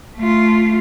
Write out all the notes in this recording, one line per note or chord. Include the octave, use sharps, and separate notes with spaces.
A3 F4